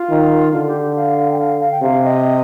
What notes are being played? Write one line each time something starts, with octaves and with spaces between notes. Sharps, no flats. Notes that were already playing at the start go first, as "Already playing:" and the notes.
Already playing: F4
D#3
D3 F4
G4
G4
F5
F5
G5
F5
F5
G5
C3 F5
D#5